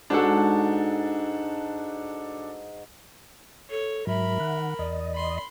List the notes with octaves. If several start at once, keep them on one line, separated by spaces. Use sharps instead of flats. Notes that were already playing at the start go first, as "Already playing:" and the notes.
G#2 D4 F#4 A4
A4 C#5
G#2 F#3 A#4 E5 B5
D#3 F#5
E2 D5 D#5
B5 C6